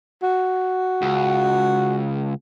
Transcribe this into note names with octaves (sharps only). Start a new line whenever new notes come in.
F#4
C#2